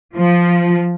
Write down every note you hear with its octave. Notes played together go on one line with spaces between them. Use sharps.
F3